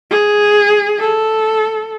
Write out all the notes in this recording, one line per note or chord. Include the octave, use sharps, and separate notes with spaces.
G#4
A4